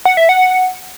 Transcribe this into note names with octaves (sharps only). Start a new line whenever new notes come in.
F#5
E5
F#5